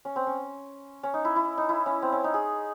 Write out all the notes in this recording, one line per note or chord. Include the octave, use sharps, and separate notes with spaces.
C#4
C4
C#4
C#4
D#4
E4
E4
D#4
E4
C#4
C4
C#4
D#4
G#4